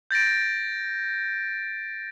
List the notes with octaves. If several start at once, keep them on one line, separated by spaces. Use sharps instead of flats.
G6 A6 A#6 D7